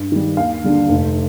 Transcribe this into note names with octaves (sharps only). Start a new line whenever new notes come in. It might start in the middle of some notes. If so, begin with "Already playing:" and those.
Already playing: G2
D#3 G3
D#2 F5
D3 G3 A#3
F1